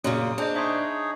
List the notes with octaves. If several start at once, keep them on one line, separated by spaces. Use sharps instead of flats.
F#2 A#2 C#3 D#6
D4 G#4 C5 D#5
D#4 G#4 C#5 E5 C6